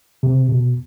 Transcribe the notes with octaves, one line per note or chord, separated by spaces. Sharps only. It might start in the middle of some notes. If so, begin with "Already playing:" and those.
C3
B2